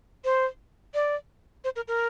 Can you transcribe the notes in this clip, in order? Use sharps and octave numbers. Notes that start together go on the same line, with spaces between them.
C5
D5
C5
A#4
A#4